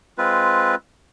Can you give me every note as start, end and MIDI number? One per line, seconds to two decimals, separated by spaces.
0.18 0.75 56
0.18 0.75 60
0.18 0.75 65
0.18 0.75 71